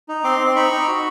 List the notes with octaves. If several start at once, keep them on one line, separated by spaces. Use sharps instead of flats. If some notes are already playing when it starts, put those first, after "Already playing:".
D#4
C4 C6 D6
C4
C6
D#4 B5 C#6
D#4
F#4